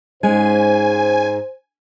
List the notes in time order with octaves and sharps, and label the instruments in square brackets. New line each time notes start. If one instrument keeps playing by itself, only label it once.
[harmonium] G#2 [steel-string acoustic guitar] G#3 C#4 [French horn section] C5 [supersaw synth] G#5